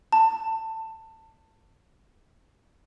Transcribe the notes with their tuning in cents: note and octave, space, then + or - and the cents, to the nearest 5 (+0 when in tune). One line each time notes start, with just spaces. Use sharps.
A5 +20